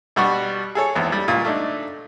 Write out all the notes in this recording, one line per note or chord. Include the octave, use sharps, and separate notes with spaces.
B2 G3 F#4 C#6
G#4 A4 C#5
G#1 E2
G3
C#2 A#2
A3 D4 D#4